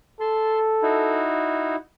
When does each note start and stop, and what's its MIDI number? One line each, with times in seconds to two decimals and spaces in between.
0.21 1.27 69
0.21 0.58 81
0.21 0.58 84
0.82 1.76 63
0.82 1.76 64
0.82 1.76 66